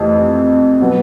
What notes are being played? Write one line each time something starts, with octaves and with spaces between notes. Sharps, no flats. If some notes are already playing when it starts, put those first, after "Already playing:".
Already playing: F2 C3 E3 A3
B2 F#3 B3